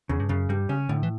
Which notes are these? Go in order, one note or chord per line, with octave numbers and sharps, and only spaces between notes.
E2 C#3
G2
F#2 C#3
G2 G3
C#3 C#4
A2 D3
E3